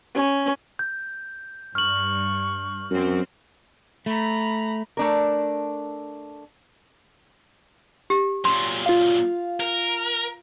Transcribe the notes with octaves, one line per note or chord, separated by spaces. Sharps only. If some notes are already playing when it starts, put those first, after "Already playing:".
C#4
G6
G2 C#6 F6 F#7
F#2 F#3 C4
A3 A#5 B5
A3 D4 A#4
G4
A#2 F#3 C6
F4 F5
A#4